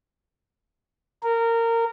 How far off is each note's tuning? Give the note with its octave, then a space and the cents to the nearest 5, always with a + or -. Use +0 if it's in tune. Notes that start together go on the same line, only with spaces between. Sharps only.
A#4 -20